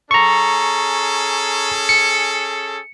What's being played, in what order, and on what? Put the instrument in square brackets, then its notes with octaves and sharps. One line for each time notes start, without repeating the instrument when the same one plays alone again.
[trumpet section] C#4 G#4 A4 [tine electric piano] A#5 C#6
[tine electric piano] C#7